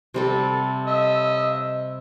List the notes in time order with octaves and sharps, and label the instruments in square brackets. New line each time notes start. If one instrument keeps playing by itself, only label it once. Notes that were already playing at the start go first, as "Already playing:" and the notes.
[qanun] C3 G3 A4
[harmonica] D#5 E6